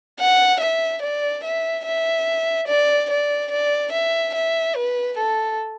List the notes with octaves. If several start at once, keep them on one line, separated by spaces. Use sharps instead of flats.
F#5
E5
D5
E5
E5
D5
D5
D5
E5
E5
B4
A4